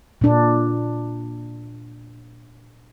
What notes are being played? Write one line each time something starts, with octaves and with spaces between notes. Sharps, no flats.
A#2 D4